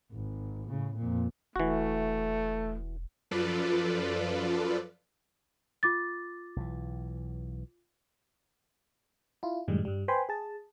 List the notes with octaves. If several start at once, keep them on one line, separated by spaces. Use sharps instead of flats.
G#1
A2 C#3
F2 A#2
E1 E3 A3 F#4
F#2 F3 F4 A4 B4 D5
F4 D6 A6
B1 E3
E4 F4
F#2 A2 D#3 G3 G#3
G2 G3
B4 C5 G5 G#5 B5 C6
G#4 A5